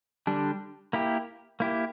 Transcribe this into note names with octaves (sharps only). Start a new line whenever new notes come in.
D3 G3 D4
A#3 E4 G4
A#3 E4 G4